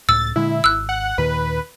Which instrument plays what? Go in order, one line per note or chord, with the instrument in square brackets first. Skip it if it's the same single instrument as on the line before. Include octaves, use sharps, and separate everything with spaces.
[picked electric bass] C#2 A2 [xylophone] E6 [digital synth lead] A6
[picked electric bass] A#2 D3 G#3 [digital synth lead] E4
[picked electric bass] G#1 [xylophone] E6 F#6
[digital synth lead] F#5
[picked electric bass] D#2 A#2 D#3 [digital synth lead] B4